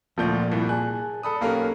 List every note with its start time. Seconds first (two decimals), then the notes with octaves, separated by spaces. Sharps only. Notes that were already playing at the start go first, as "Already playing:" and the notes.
0.18 D1 D2 A#2 F3 D5 G6
0.52 C2 G2 E4
0.69 G#4 G#5 A5 F#6
1.23 A4 D5 B5 D#6
1.41 B1 A#3 C#4 G4 A4 A#4